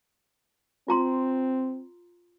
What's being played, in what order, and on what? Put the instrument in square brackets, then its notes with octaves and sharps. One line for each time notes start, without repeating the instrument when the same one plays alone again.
[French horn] C4 [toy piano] F4 A#5 C6